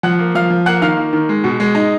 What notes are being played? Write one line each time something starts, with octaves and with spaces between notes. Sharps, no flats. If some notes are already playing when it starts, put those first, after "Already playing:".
F3 F#5 F#6
A#3
F3 F5 F6
F3
A#3 F#5 F#6
D#3 F5 F6
A#3
D#3
G#3
B2
G#3
D#4